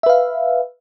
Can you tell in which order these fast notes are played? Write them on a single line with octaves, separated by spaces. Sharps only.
E5 B4 F5